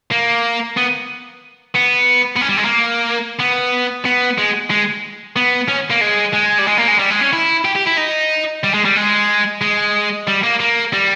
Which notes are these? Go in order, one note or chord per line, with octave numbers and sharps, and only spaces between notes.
A#3
B3
B3
B3
C#4
G3
G#3
A#3
B3
B3
G#3
G#3
B3
C#4
A#3
G#3
G#3
G3
G#3
A#3
G#3
G3
G#3
C#4
E4
G4
G4
E4
D#4
G3
G#3
G3
G#3
G#3
G3
A#3
A#3
G3